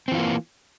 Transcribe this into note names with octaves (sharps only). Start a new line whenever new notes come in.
E3 A#3 C4 F4